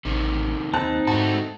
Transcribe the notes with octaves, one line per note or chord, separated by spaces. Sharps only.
A1 C3 D#3
D#2 C4 D#4 A5 F#6
G#2 A3 F#4 A5